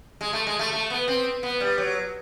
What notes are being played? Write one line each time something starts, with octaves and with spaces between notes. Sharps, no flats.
G#3
A3
G#3
A3
A3
B3
C4
B3
G3
F#3